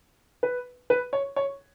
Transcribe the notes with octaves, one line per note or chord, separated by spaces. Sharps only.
B4
B4
C#5
C#5